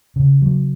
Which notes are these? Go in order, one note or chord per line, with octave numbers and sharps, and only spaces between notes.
C#3
F#3